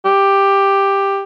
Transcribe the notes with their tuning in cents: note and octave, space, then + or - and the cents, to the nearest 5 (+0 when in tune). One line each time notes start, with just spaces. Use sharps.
G4 +10